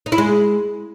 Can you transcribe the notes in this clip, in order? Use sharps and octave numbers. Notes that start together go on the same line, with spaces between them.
D#4
E4
G#3